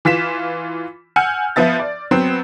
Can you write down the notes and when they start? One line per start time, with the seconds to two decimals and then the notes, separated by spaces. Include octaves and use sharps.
0.05 E3 F4 B6 E7
1.16 F#5 G#5 E6 F6 G6 C#7
1.56 F3 B3 E5 A6
1.80 D5
2.11 F#3 B3 C4